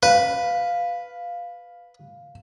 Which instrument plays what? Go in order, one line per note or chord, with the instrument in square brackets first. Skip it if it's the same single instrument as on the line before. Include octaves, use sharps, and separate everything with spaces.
[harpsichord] B4 [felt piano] F5